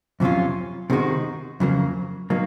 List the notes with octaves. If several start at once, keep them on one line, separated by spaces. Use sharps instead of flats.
F2 C3 F#3 C#4 F4
C3 D#3 G#3 D#4 F#4
F2 C#3 F#3 A#3
F#3 A#3 D#4